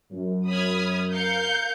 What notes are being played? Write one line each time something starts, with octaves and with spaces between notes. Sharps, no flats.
F#2
B5 D#6 F6 G#6
A#4 F5 G6 C#7